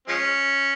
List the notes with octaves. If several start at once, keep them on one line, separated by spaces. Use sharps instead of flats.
F3 G#3 C#4